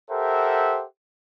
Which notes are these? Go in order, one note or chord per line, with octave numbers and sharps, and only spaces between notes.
G4 A4 A#4 C5 E5 F#5